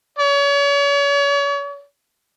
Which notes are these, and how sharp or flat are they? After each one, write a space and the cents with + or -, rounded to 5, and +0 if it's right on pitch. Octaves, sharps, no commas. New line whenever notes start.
C#5 +40